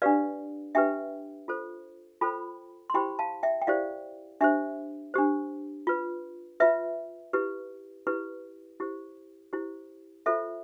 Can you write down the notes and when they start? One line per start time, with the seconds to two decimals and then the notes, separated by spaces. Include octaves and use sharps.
0.02 D4 G4 B4 D5 F5
0.75 D4 G4 B4 E5 G5
1.48 F4 A4 C5
2.21 F4 A4 C5 G5 B5
2.90 C6
2.94 E4 G4 C5 G5 B5
3.19 F5 A5
3.43 E5 G5
3.62 G5
3.67 E4 G4 C5 D5 F5
4.41 D4 G4 C5 E5
5.14 D4 G4 C5
5.87 F4 B4
6.60 F4 B4 E5
7.33 E4 G4 B4
8.07 E4 G4 B4
8.80 E4 G4 C5
9.53 E4 G4 C5
10.26 F4 A4 C5 E5